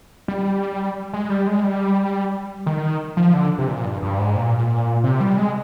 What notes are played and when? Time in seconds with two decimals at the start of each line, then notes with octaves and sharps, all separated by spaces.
0.28 G3
1.13 G#3
1.30 G3
1.47 G#3
1.64 G3
2.67 D#3
3.17 F3
3.34 D3
3.58 C3
3.68 A#2
3.85 G2
4.02 G2
4.19 G#2
4.36 A#2
5.04 C3
5.21 G3
5.38 G#3